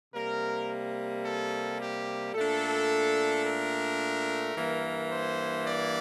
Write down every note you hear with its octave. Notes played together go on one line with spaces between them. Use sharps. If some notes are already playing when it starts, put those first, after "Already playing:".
C3 G3 A#3 A#4
A4
G4
A#2 A3 D4 A4
A#4
G2 E3 A#3
C5
D5